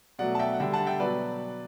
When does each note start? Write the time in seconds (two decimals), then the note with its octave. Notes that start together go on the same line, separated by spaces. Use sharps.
0.19 B2 F#3 A3 D5 F#5
0.35 A5
0.39 E5 G5
0.53 F#5
0.60 D3 G3 E5 G5
0.73 F#5 A5
0.86 E5 G5
1.00 B2 F#3 B4 D5